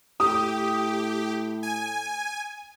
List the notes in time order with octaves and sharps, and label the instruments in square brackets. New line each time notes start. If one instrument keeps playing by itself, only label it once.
[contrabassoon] A2 [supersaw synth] G4 [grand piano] D#6
[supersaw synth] G#5